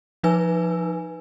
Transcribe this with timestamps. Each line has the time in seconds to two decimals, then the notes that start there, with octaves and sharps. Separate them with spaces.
0.23 F3 D#4 B4 G#5 E6